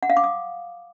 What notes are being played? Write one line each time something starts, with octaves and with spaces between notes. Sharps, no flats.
F#5
F5
D6
D#6